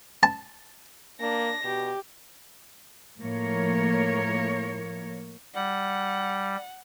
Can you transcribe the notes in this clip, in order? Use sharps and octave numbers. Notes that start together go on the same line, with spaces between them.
A5
A#3 D4 A#6
B2 G4
A2 F3 A#3 A#4 C#5
G3 F#5